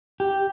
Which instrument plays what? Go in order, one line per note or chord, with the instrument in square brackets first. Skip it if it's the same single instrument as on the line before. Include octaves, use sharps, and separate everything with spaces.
[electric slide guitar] G4